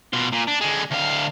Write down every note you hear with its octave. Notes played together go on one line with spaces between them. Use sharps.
B2 F4
A#2
D4
D3 G#3
D2 F5